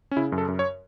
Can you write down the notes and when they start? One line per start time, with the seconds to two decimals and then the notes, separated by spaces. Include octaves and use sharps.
0.11 C#4
0.17 C#3 E4
0.32 F#2
0.38 A4
0.48 F#2
0.59 C#5